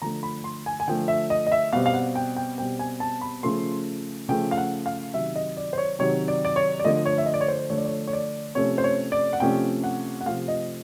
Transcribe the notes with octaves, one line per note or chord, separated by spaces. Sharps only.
D3 F3 A3 A#5
B5
C6
G#5
G#5
D3 F3 A3 G5
E5
D#5
D#5
E5
B2 G3 C4 F5
F5
F#5
G5
G5
B2 G3 C4 G5
G#5
A5
B5
C#3 F3 A3 C6
C#3 F3 A3 G5
F5
F#5
F5
C3 D#3 F#3 E5
D#5
D5
C5
C#5
C3 D#3 F#3 C#5
D5
D5
C#5
D5
D3 F3 A3 D#5
C#5
E5
D#5
D5
C#5
C5
D3 F3 A3 C#5
D5
C#5
C#5
D5
C3 F3 A3 C#4 C#5
C5
C#5
D5
F#5
C3 F3 A3 C#4 G5
F#5
F#5
C3 F3 A3 F5
D#5